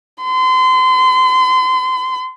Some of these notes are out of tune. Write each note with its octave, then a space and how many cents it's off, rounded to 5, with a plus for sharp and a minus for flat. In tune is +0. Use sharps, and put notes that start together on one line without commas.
C6 -30